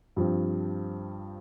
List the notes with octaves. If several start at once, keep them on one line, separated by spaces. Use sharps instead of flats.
G2 F3 C4